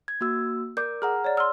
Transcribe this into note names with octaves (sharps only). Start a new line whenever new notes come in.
G#6
A#3 F#4 E6
A#4 D5 D6 G6
G#4 F#5 A#5 F6
C#5 D5
C6 E6 F6